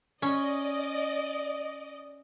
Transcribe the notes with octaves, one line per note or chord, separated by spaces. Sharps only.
C#4 D5 D#5